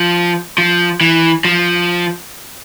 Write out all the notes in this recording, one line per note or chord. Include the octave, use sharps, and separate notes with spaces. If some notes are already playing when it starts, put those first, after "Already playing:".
Already playing: F3
F3
E3
F3